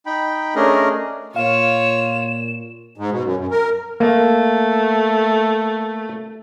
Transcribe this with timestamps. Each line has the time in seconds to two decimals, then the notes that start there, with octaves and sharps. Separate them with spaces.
0.06 D#4 G5 B5
0.55 A3 C#4 D4 G#4 A#4 D#5
1.36 A#2 F4 C#5 F5 E7
2.98 G#2
3.11 B2
3.24 F#2
3.37 F#2
3.51 A#4
4.00 A3 A#3